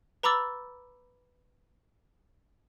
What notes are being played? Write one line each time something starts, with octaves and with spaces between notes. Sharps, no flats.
B4 A#5 B5 D6 E6 A6